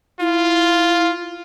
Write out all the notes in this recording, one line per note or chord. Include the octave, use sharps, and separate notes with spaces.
E4 F4